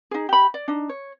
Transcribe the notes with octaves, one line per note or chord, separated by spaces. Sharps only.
D#4 G#4
G4 B5
D5
D4 D#4
C#5